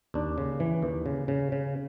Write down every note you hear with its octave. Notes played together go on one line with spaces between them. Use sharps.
D#2 D4
C#3
E3
D#2
C#3
C#3
C#3